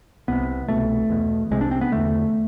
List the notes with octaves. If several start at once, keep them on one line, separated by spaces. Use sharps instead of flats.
C2 C3 B3
C2 B2 A3
E2 B2
C2 C3 G#3
D4
C4
B3
E2 D3 A3